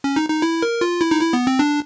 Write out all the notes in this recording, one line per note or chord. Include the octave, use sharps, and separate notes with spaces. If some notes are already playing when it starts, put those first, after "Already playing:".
C#4
D#4
D#4
E4
A#4
F4
E4
D#4
E4
B3
C4
D4